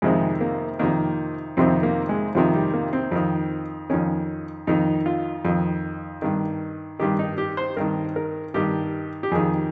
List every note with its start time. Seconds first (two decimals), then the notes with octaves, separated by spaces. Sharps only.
0.02 F2 C3 D#3 G#3
0.41 A#3
0.79 F2 C3 D#3 A#3
1.57 F2 C3 D#3 C4
1.83 A#3
2.09 G#3
2.35 F2 C3 D#3 F3
2.54 G3
2.74 A#3
2.93 C4
3.12 F2 D#3
3.90 F2 D#3 C#4
4.67 F2 D#3 D#4
5.06 F4
5.45 F2 D#3
6.22 G2 D#3
6.99 G2 D#3 G4
7.19 D#4
7.38 G4
7.57 C5
7.77 G2 D#3 A#4
8.16 A#4
8.54 G2 D#3 G4
9.23 G4
9.32 F2 D#3 G#4